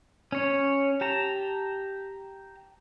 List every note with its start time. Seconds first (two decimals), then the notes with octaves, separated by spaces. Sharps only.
0.32 C#4 C#5
1.01 G4 A5 A#5